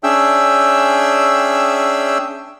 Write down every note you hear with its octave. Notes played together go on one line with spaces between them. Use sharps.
C#4 D4 G#4 E5 G5 E6